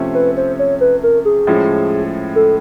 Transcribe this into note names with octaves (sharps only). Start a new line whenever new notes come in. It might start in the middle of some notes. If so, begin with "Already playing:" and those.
Already playing: C3 F3 A3 C#4
B4
C5
C#5
B4
A#4
G#4
A2 F3 G#3 C#4
A4